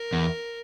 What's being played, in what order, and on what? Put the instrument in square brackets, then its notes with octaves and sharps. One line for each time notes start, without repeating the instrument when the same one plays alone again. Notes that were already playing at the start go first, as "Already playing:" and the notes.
Already playing: [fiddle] A#4
[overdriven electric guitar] E2